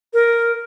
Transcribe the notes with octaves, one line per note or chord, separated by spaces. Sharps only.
A#4